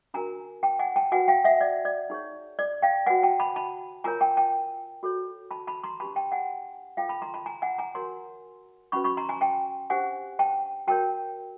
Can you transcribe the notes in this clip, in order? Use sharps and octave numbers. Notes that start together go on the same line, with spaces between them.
D4 F#4 A#4 G#5 A#5
G5 A5
F#5 G#5
G5 A5
F#4 B4 F#5 G#5
F5 G5
E5 F#5
D5
D5
D#4 G#4 C#5
D5
F5 G5
F#4 B4 F#5 G#5
G5 A5
A5 B5
A5 B5
F4 A#4 C#5 G#5 A#5
G5 A5
G5 A5
F#4 A4 C#5
A5 B5
A5 B5
A#5 C6
D4 G4 B4 A5 B5
G5 A5
F#5 G#5
F4 A4 C#5 F5 G5
A5 B5
A#5 C6
A5 B5
G#5 A#5
F#5 G#5
G#5 A#5
F#4 A#4 C#5 A#5 C6
C#4 F#4 B4 B5 C#6
B5 C#6
A#5 C6
G#5 A#5
G5 A5
D4 G4 C5 F#5 G#5
G5 A5
F#4 A#4 C#5 G5 A5